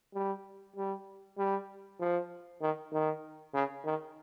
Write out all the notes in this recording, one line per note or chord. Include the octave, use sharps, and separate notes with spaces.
G3
G3
G3
F3
D#3
D#3
C#3
D#3